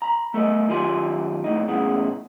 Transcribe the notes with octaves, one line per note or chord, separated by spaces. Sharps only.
A#5 B5
A3 A4 A#4 D#5
F#2 D#3 F4 G4 G#5 C6
F2 A2 D#4
A2 C#3 E3 G#3 B3